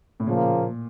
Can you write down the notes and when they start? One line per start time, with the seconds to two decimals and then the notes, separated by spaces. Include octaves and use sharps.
0.20 A2
0.26 A#2 C#3 F3 A#3